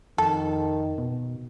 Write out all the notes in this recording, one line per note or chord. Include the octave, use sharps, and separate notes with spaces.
F2 D#3 A4
B2